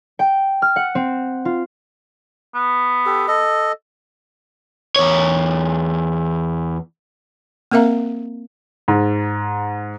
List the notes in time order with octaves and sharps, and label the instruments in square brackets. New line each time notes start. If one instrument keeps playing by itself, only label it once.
[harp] G5
F6
F#5
C4
F4
[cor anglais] B3
[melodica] G4 A4
A4 D#5
[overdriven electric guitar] E2 C#5
[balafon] A#3 C4 A#4 E5 F5 A#5
[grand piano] G#2